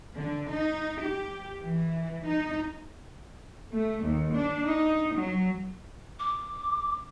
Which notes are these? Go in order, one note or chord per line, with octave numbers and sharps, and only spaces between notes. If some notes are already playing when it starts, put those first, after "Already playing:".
D3
D#4
G4
E3
D#4
A3
D#2
D4
D#4
F#3
D6